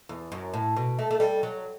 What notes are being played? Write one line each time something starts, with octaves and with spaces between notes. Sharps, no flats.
E2
F#2
A2
B2
A3
A3
G3
F#3